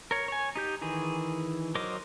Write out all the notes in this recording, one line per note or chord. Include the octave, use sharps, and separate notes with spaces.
A#4 C#5
C#5 G#5
D#4 G4 G6
D#3 E3 G#4
F#3 A#4 C5 D#5 D6